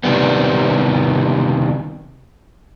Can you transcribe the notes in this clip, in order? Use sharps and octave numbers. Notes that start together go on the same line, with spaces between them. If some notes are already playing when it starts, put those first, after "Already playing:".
C3 D#3 G3 B3